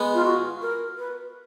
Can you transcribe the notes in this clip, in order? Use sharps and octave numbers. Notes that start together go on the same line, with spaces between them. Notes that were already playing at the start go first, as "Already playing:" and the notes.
Already playing: G#3 B3
F4
F#4
A#4
B4